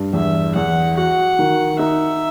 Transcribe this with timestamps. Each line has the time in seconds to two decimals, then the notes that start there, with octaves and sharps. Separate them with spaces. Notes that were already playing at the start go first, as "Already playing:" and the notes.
Already playing: G2
0.13 E2 E5
0.55 E2 F#5
0.97 F#4 F#5
1.39 D#3
1.79 D#4 E5